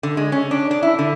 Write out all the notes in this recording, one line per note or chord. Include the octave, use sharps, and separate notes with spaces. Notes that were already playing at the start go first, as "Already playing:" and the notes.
D3
G#3
C#4
D4
D4
E4
D3